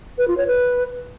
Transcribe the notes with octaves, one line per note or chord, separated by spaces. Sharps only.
B4
F4
C#5
B4